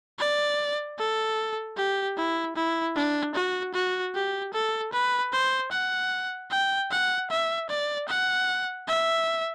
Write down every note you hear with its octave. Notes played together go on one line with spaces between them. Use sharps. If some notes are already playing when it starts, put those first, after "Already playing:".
D5
A4
G4
E4
E4
D4
F#4
F#4
G4
A4
B4
C5
F#5
G5
F#5
E5
D5
F#5
E5